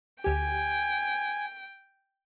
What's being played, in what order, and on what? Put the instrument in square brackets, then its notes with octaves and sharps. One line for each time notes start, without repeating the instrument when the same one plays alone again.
[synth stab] D2 G4 [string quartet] G5 [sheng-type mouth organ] G#5